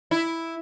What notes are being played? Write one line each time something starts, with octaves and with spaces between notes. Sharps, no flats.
E4